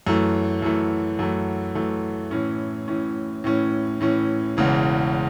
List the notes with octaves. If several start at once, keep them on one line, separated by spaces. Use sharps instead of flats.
F#2 E3 A3
F#2 E3 A3
F#2 E3 A3
F#2 E3 A3
A2 E3 C#4
A2 E3 C#4
A2 E3 C#4
A2 E3 C#4
E1 E2 C#3 E3